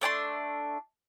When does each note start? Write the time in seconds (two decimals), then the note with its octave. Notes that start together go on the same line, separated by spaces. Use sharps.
0.01 A3 D4 A5 C6